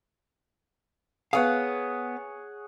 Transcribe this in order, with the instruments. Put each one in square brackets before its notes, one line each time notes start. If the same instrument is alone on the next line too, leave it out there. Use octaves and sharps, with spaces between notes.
[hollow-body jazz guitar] B3 F5 [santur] G#4 C#5 F#5